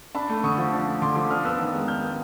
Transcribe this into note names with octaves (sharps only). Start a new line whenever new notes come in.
D4 A5 B5
A3
D3 C#6 D#6
F3
D4
A3
D3 C6 D6
F3 C6 D6
D4 D#6 F6
B3 E6 F#6
D#3
G#3
D4 F6 G6
B3